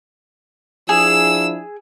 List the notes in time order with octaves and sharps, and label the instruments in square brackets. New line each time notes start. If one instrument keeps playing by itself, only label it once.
[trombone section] F3 D4 E4 [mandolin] G#4 [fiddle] E6